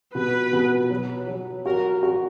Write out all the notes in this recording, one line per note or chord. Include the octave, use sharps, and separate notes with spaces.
B2 B4
B2
F#3
F#3
F#4 A#4
F#4